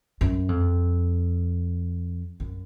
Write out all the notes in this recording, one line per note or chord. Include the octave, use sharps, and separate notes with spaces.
F#2
F2
F#2